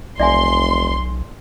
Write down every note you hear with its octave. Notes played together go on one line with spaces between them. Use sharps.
F1 B1 D5 E5 G#5 C6